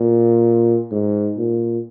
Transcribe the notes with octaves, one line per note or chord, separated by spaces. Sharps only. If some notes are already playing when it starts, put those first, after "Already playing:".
Already playing: A#2
G#2
A#2